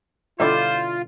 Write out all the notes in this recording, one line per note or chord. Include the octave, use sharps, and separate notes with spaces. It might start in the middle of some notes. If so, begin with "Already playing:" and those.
B2 D3 G3 E4 F4 C5 D5 E5